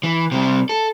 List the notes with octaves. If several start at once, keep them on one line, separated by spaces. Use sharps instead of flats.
E3
C3 G3
A4